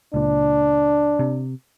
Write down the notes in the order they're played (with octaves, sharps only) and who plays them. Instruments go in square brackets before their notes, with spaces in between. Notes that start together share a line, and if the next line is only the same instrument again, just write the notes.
[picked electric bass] C#2 A#2 [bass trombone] D4
[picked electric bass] C3